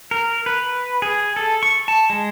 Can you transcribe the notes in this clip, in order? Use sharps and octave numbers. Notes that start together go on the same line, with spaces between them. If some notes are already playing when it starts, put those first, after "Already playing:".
A#4
B4
G#4
A4
C#6
A5
G#3